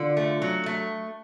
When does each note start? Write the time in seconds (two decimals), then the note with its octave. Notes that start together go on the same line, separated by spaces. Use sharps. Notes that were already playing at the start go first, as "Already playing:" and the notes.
Already playing: D3 F4
0.17 A3
0.42 F#3
0.66 A3